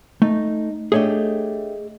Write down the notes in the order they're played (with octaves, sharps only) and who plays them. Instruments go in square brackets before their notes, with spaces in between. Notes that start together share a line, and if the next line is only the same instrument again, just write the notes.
[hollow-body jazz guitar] A3 [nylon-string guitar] D#4
[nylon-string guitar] A3 D4 G4 [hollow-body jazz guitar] G#4 C#5 D#5